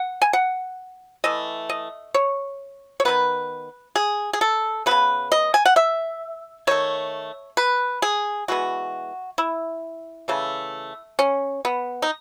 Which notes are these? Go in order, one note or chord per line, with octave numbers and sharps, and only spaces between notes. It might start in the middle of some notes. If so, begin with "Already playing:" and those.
Already playing: F#5
G#5
F#5
E3 A3 D#5
D#5
C#5
C#5
D#3 F#3 B3 B4
G#4
G#4
A4
F#3 B3 B4
C#3
D#5
G#5
F#5
E5
D#3 A3 C#5
B4
G#4
E3 G#3 B3 F#4
E4
C#3 E3 A3
C#4
B3
D#4